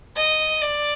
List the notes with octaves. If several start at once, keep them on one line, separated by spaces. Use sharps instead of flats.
D#5
D5